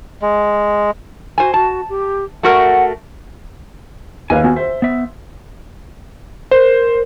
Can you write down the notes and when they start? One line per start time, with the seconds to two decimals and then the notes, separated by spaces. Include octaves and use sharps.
0.22 G#3
1.38 F#4 C5 G#5
1.54 F#4 A5
1.89 G4
2.43 A3 F#4 A#4 F#5
4.30 D#2 B4 F5 G#5
4.44 B3 F#4 G#5
4.56 C5 E5
4.82 B3 E5
6.51 A#4 C5